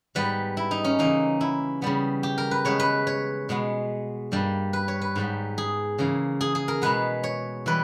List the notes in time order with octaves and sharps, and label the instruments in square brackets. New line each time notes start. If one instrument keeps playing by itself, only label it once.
[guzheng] G#2 G3 B3 B4
E4
D#4
C#4
C#3 E3 A#3 D#4
E4
C#3 G3 B3
G4
A#4
B4
C#3 G#3 B3 C#5
B4
C#5
B2 G#3 B3
G2 G3 A#3
B4
C#5
B4
G#2 G3 B3
G#4
C#3 E3 A#3
G#4
G#4
A#4
B2 G#3 B3 B4
C#5
E3 G3 B4